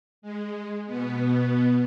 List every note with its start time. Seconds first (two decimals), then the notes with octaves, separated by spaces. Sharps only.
0.22 G#3
0.86 B2 B3